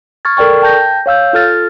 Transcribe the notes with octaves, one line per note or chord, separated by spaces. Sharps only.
C#6 F6 G#6 A6
A4 A#4 D5 G5 C#6
G5 A5 G6 A#6
C#5 F5 E6 G6
F4 A4 F6 A6